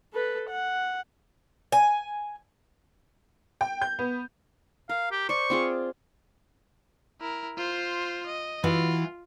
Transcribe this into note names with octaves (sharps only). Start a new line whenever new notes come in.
A4 B4
F#5
G#5
G5
G6
B3
A#4 F5
G4
C5 D5 C#6
C4 F4 G#4
E4 A#4
F4 C5
D#5
E3 F4 F#4